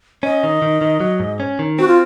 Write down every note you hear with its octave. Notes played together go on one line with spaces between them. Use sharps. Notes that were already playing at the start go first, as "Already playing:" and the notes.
C#4 D#5
D#3
D#3
D#3
F#3
G#2
C#4
D#3
C4 F#4
F4